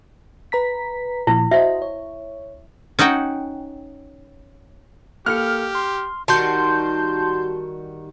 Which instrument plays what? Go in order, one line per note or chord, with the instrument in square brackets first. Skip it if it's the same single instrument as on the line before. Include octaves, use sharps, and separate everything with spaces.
[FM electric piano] B4 A#5 B6
[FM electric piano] A#2 F3 [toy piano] E4
[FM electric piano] F#4 C5 D#5 [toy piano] E5
[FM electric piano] C#5
[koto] C#4 D#4 F#4 F#5 G5
[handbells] A#3 A4 C#7 [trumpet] G4 [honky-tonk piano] F6
[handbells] C6
[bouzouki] D#3 G3 F#4 [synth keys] A5 C6 G6